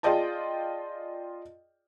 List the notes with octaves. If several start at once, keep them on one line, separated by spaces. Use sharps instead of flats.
F4 G#4 D5 D#5 G5 A5